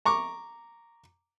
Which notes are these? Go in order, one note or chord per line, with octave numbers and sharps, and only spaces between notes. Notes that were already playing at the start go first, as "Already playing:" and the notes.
A#5 C#6 D6